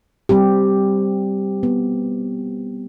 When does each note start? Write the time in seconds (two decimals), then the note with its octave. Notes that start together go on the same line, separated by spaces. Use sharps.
0.29 G3 C4 G4
1.63 B3